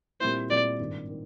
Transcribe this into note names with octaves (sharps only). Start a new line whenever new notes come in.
A#2 G3 C4 E4 C5
A#2 G3 C4 E4 D5
G#1 G2 D#3
D#3